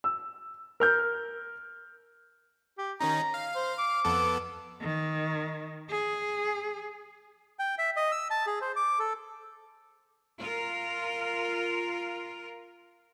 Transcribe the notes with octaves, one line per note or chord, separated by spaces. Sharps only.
E6
A#4 F6 G6
G4
D#3 C#4 D#4 A#5
F5
C5
D6
F2 B3 A4
D#3
G#4
G5
E5
D#5
E6
A5
G#4
C5
D6
A4
F4 A#4